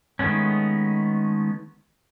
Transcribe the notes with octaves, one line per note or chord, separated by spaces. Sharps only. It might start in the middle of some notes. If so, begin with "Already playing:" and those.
D#3 G#3 A3 B3 C#4